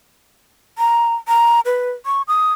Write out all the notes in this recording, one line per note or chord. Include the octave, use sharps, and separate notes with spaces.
A#5
A#5
B4
C#6
D#6